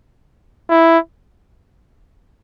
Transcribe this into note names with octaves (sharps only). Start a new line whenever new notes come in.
E4